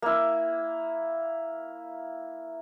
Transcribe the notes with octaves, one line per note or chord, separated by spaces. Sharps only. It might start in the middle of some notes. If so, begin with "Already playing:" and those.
A#3 E4